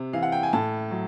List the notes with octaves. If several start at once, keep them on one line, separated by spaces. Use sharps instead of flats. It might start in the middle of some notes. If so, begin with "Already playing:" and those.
Already playing: C3
E3 F5
F#5
G5
G#5
A2 A5
F#3